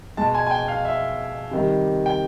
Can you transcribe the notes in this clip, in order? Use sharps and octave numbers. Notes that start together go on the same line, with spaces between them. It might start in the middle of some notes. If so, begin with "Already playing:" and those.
B2 G#3 A5
G#5
G#5
G5
F5
E5
C3 D#3 G3
G5